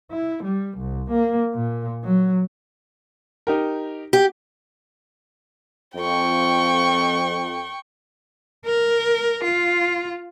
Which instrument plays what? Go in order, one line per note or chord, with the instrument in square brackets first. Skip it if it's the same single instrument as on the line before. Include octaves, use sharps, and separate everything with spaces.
[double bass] E4
G3
C2
A#3
A#2
F#3
[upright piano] D#4 G4 A#4
[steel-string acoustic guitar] G4
[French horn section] F2 [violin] G5 C#6
[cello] A#4
F4